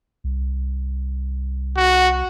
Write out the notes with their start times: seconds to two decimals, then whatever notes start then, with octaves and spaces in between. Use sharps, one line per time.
0.24 C2
1.77 F#4